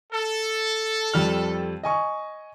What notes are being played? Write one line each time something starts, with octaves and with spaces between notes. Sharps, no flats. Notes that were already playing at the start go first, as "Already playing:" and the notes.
A4
F2 G3 F6
D#5 G#5 C#6